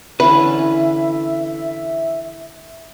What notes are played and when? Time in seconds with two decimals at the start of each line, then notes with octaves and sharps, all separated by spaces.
0.20 D3 E3 C#4 B4 E5